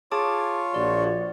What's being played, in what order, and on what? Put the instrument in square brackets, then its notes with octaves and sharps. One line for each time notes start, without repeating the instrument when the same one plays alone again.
[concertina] F4 C#5 [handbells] G#4 A5 D6
[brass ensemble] A#1 F3 F#4 [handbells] D5